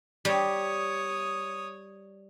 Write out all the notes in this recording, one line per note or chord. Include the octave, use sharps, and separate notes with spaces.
G3 C#5 D#6